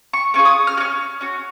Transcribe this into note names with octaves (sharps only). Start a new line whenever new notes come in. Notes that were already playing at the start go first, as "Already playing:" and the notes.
C#6
A#3 C#4 F4 G#4 C#6
D#6
F6
C#4 F#4 F6
C#4 F#4